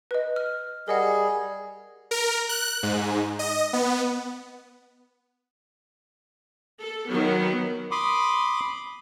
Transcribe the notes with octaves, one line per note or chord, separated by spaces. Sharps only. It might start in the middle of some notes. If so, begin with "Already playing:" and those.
B4 D#5
F6
G3 G#4 A#4 D#5 F#5
A#4
F#6
G#2
D#5
B3
A4
D#3 F#3 B3
B5 C6 D6 D#6